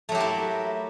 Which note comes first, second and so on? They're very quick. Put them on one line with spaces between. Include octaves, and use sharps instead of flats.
A3 F#3 G4 A#3 E4